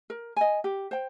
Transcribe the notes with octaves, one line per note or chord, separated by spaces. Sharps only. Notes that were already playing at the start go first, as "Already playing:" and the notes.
A#4
D#5 G#5
G4
C5 G5